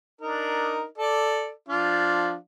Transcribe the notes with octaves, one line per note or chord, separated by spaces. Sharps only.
D4 D#4 A#4
A4 D5
F3 D4 F4